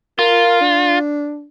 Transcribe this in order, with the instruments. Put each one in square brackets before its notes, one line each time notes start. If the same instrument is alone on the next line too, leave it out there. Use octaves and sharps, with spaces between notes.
[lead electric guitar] F4 [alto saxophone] A#4
[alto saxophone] D4